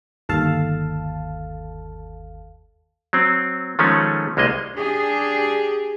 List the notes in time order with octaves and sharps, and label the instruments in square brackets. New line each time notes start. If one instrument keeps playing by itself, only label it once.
[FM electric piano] G1 D#2 A4 F5 A5
[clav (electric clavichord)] F#3 C4
D#3 F3 G#3 A3 C#4
C2 G#3 A#3 D#5
[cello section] D4 G4 G#4